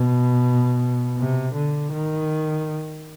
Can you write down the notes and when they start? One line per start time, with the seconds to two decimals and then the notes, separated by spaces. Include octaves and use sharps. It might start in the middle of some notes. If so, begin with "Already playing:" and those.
Already playing: B2
1.17 C3
1.55 D3
1.93 D#3